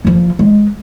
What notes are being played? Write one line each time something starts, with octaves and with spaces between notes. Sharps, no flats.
F#1 F3
G#3